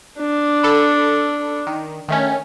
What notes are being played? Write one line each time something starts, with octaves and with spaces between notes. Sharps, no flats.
D4
A4 B5
D#3
D#3 A3 C#4